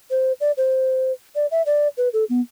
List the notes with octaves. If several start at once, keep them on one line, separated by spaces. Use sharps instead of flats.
C5
D5
C5
D5
E5
D5
B4
A4
B3